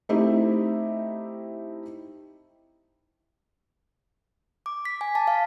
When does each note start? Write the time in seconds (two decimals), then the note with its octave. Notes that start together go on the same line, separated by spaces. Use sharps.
0.09 A3 C4 D#4 E4 G4
4.66 D6
4.85 B6
5.01 G#5
5.15 A5
5.27 F5